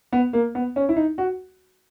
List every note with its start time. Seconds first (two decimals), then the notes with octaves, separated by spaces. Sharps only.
0.13 B3
0.33 A#3
0.55 B3
0.76 C#4
0.89 E4
0.96 D#4
1.18 F#4